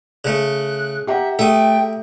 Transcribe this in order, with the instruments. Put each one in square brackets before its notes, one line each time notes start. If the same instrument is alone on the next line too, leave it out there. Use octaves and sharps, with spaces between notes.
[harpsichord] C#3 A3 [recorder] F#6
[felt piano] G4 F#5 A#5 [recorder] E5
[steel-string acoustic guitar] A3 [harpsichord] E5 D#6 [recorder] G5